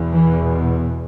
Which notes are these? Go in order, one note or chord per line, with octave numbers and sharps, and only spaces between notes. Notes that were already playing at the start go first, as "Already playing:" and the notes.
Already playing: E2 B2
E3